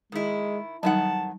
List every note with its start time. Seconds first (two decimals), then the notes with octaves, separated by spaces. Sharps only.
0.12 D#3 G#3 E4
0.83 F2 D#3 F#3 G3 D#4 F#5 A5